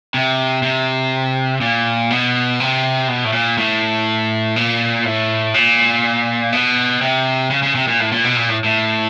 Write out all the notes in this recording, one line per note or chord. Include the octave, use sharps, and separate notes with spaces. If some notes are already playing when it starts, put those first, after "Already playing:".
C3
C3
A#2
B2
C3
B2
A2
A#2
A2
A#2
A2
A#2
B2
C3
C#3
C#3
C3
A#2
A2
A#2
B2
A#2
A2
A2